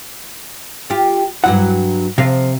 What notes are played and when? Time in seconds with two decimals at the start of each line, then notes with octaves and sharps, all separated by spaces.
0.90 F4 G4
1.44 G2 F#3 E4 F#5
2.18 C3 F3 F5